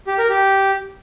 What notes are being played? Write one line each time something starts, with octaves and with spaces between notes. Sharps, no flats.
G4
A#4
G4